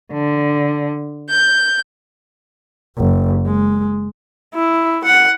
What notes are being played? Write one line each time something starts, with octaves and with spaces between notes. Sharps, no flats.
D3
G6
F#1
G#3
E4
F#5